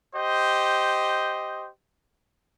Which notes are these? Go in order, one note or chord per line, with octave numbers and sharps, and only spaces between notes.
G4 C5 D#5